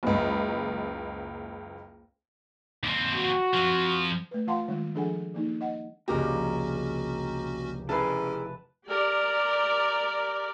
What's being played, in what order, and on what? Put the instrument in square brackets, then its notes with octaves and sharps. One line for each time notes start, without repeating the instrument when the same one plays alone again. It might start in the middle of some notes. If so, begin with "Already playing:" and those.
[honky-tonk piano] F#1 C#2
[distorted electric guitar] D#2 C4
[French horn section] F#4
[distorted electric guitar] F2 F3
[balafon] A3 B4
E3 F4 F5 F#5 A5 C6
D#3 G3 G#3 F4
F3 D4 G#4 A4 F#5 G#5
E3 A#3 D#4
D#5 F#5
[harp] F1 C#2 A#5 [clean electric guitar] A#2 [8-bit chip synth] C#4 F#4 [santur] G4 A#4
[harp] A3 C7 [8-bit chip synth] C#4 [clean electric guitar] E4 G#4 A#4 [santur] B4 A5
[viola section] G4 A#4 D5